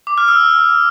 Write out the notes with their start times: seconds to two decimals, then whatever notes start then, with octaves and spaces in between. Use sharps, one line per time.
0.07 D6
0.18 F6
0.28 E6